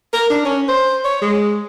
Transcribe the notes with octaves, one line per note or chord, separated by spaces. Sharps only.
A#4
D4
C#4
C5
C#5
G#3